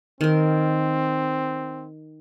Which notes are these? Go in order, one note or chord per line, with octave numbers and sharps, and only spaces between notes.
D#3 C4 A#4